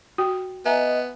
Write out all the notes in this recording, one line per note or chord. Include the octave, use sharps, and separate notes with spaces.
F#4 G5
B3 D#5 E5 G#5 A#5